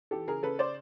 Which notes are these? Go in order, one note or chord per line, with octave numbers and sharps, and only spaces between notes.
E3 G4 A4
C#3 G#4 A#4
C#3 A4 B4
C5 D5